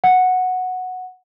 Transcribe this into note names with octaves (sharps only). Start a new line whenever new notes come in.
F#5